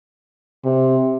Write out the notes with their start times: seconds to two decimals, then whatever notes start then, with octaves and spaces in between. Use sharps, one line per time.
0.65 C3